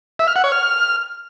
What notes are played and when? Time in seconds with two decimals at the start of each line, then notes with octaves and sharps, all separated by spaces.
0.19 E5
0.28 F6
0.36 F#5
0.44 C#5
0.52 F6